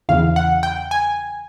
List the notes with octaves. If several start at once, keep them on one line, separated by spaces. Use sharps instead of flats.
E2 C#3 E3 F5
F#5
G5
G#5